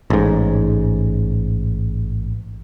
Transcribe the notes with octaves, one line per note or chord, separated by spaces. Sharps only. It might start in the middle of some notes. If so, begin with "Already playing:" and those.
A1 G#2